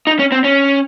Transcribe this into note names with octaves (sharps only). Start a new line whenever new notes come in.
D#4
C#4
C4
C#4